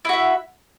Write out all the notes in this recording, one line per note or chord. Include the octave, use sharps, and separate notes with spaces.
E4 F#4 E5